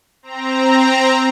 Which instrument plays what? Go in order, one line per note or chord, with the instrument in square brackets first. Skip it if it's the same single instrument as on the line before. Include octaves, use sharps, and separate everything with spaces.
[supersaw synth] C4 A#5